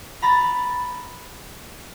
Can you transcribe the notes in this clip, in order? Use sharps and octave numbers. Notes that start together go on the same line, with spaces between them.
A#5 B5 A6